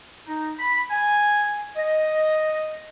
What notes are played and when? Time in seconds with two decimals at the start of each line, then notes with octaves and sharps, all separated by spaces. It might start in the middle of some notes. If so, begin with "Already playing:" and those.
0.26 D#4
0.59 B5
0.91 G#5
1.76 D#5